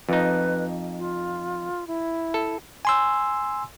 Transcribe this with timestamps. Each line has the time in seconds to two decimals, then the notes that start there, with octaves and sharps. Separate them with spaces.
0.09 F2 D#4 B4
0.98 F4
1.87 E4
2.34 A4
2.85 G#5 C6 E6